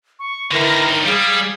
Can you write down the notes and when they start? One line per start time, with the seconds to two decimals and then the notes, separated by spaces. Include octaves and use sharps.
0.19 C#6
0.51 D3 D#3 E4 A#4 B4 A#6
0.90 C#5 G7
1.05 G3 G#4 F5